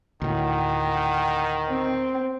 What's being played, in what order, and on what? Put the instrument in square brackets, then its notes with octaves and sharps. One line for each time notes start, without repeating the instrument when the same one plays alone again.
[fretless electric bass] D2 A2 [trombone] D#3 [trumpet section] F#5 G5
[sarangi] C4